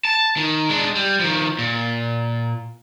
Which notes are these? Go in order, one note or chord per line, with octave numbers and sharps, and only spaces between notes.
A5
D#3
G#3 D4
G3
D#3 F3
A#2